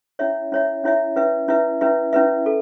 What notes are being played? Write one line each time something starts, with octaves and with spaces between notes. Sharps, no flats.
C#4 E4 C#5 E5
C#4 E4 C#5 E5
C#4 E4 C#5 E5
C#4 E4 B4 E5
C#4 E4 B4 E5
C#4 E4 B4 E5
C#4 E4 B4 E5
A4